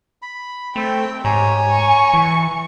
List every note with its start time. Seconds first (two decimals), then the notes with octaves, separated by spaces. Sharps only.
0.22 B5
0.76 A3 C4 G5
1.25 G#2 G4 C#5 G#5 A#5
1.69 C#6
2.13 E3